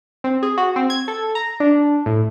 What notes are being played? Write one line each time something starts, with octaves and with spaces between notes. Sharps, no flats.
C4
G#4
F#4
C4
G#6
A4
A#5
D4
A2